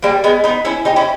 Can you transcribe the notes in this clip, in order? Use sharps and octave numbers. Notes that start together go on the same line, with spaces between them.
G3 A#3
G#3 B3
B3 D#4
C#4 E4
D#4 G4
C#4 E4